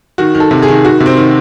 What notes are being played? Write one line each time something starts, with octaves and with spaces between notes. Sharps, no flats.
D#3 F#4
D#3
A4
C3
G#4
D#3
D#3 F#4
C3
C4
D#3